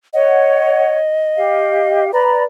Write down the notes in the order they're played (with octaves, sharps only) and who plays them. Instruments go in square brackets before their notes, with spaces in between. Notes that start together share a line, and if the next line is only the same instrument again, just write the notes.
[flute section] C#5 F#5 [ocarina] D#5
[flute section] G4 F5
[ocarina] B4 [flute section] D5 A#5 B5